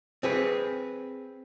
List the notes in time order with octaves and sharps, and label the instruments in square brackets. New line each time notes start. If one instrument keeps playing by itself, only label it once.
[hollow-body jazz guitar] C4 G#4 B4